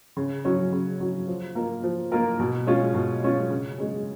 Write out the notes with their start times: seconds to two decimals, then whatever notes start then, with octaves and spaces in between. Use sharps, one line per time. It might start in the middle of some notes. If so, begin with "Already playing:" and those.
0.17 C#3
0.45 F#3 C#4
0.72 C#3
1.00 F#3 C#4
1.28 F3
1.55 A#3 F4 A#4
1.84 F3
2.12 A#3 F4 A#4
2.39 B2
2.67 G#3 C#4 F4
2.95 B2
3.22 G#3 C#4 F4
3.50 C#3
3.78 G#3 C#4 G#4